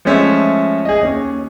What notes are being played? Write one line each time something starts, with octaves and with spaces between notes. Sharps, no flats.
F3 G#3 A3 C#4 E5
G#4 D#5
D#2 C#4